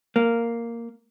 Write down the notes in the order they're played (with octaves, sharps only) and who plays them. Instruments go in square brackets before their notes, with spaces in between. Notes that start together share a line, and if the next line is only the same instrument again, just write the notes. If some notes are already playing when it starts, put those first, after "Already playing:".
[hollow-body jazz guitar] A#3